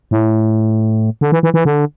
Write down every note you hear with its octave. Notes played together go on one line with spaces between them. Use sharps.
A2
D3
E3
E3
E3
D3